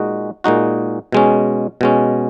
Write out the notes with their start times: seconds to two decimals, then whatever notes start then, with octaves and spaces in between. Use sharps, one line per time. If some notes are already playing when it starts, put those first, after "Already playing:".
Already playing: A#2 G#3 D#4 F#4
0.44 A#2 G#3 D#4 F#4
1.12 B2 G#3 C#4
1.81 B2 G#3 C#4